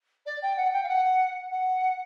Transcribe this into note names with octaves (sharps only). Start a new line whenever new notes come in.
D5
G5
F#5
G5
F5
F#5
F#5